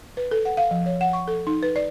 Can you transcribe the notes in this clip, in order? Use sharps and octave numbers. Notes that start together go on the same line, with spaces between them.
B4
A4
F#5
F5
F3
C#5
F#5
C#6
A4
D#4
B4
D5